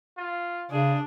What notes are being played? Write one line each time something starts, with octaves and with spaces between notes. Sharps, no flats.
F4
C#3 D4 G#4